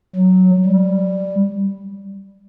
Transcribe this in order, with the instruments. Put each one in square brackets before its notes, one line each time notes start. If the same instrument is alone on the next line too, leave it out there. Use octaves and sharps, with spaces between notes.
[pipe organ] F#3
G3